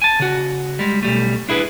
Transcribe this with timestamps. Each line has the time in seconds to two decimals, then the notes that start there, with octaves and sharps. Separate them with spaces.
0.02 G#5 A5
0.19 C#3 F#4
0.79 G3 G#3
1.03 B1 G3 A3
1.49 D4 E4 G#4 B4